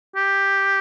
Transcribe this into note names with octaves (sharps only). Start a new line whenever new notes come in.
G4